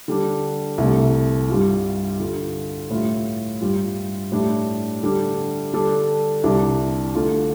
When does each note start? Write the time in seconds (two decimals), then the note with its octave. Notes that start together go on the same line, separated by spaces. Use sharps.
0.08 D3 G3 D4
0.78 C2 C3 A3
1.49 G2 G3 F4
2.20 D3 G3 F4
2.90 A2 G3 F4
3.61 G2 G3 F4
4.32 A2 G3 D4
5.03 D3 G3 D4
5.73 D3 G3 D4 A4
6.44 C2 C3 G3 D4
7.15 D3 A3 F4